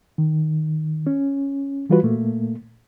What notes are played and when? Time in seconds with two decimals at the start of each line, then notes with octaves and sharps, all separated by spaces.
0.18 D#3
1.07 C#4
1.90 E3 G3 F4 F#4 B4
2.03 A#2 A3 A#3